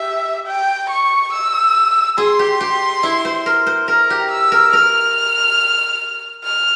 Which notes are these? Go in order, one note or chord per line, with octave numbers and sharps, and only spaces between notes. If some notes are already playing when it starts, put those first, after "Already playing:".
Already playing: G4 E5
G5
C#6
E6
G#4 C6
G4
G4
E4
C5
A#4
C5
A#4 A#5
G4
E6
A#4
A#4 F6
F6